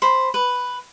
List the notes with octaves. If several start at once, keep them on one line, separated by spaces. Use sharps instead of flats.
C5 B5
B4